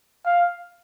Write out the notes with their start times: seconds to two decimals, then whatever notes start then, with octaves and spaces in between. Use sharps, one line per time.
0.26 F5